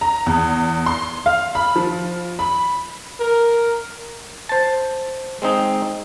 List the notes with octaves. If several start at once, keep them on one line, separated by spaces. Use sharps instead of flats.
A#5
E2
C6
F5
B5
F3
B5
A#4
C5 A5
G#3 C4 D#4